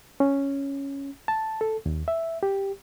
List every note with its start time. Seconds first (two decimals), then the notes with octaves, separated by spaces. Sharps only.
0.20 C#4
1.28 A5
1.61 A4
1.86 D#2
2.08 E5
2.43 G4